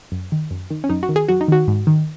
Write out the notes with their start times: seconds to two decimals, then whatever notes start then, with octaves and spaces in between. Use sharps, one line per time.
0.12 F#2
0.32 D#3
0.51 F#2
0.70 D#3
0.84 C#4
0.90 F#2 D#4
1.03 F#4
1.09 D#3
1.16 G#4
1.29 F#2 F#4
1.41 D#4
1.48 D#3 F#4
1.68 G#2
1.87 D#3